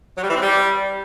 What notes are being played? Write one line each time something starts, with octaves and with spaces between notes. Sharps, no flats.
F#3
G3
E3
C4
G3